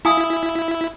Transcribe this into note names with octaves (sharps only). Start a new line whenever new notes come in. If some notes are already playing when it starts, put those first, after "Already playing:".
E4 F5 G#5 D#6